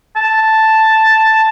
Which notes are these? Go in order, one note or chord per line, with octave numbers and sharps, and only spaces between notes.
A5